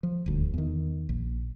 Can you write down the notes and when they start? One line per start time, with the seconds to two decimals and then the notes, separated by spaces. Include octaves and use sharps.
0.03 F3
0.26 D#1 D2
0.54 E2 D#3
1.09 A#1